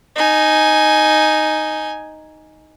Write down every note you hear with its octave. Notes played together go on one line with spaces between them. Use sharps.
D#4 G#5